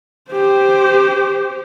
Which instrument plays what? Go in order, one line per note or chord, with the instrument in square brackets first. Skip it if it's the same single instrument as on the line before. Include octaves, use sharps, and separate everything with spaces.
[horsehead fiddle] G4 C5